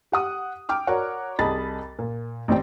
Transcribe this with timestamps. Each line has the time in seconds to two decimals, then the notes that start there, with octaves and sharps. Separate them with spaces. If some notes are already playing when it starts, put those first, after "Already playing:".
0.12 G4 F#5 D#6
0.69 G5 D6 F6
0.87 F#4 A#4 C#5 D5 F#5
1.39 C2 G#4 D#5 A5 B5 A6
1.99 A#2
2.48 A1 C4 D5 G5